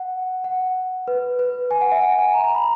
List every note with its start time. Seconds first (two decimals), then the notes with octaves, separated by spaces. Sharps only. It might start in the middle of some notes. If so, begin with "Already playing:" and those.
Already playing: F#5
0.44 F#5
1.08 B4
1.39 B4
1.71 G#5
1.81 F#5
1.92 E5
2.02 F#5
2.19 G#5
2.34 A#5
2.44 A#5
2.55 B5